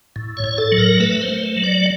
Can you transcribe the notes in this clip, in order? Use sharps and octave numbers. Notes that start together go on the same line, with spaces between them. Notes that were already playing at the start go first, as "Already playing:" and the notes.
A2
C#5
A2
A4
F#3
A#4
A3 B4
C5
A3
F#3
D5